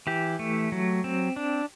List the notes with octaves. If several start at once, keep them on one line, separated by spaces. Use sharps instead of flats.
E3 G4
A3
F#3
C4
D4